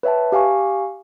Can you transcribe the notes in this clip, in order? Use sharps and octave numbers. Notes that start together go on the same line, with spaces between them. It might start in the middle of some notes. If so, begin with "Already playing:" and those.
B4 C#5 E5 G5 A5
G4 F5 G#5 C#6